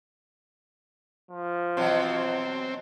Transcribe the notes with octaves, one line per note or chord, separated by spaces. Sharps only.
F3
B2 E3 F#3 C4